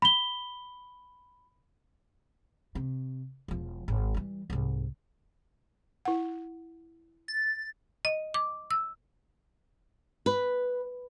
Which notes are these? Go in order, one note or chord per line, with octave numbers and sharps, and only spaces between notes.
B5 G7
C3
E1 F3
G#1
E3 G3
C2 G#2
E4 F#5
A6
D#5
D6
E6
B4